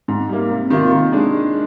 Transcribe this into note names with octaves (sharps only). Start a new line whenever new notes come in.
G#2
G3 A#3
C3
D#3 A#3 F4
D#3
G#3 D4 G#4